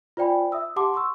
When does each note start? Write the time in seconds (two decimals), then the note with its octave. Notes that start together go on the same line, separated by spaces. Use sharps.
0.17 F4 C5 D5 G5 G#5 B5
0.52 E5 D#6 E6
0.76 G4 F#5 A5 C6 D6
0.94 C6 C#6 E6